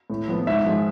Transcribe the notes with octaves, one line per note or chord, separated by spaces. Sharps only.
A2
F3 B3
G#2 E5
F3 G#3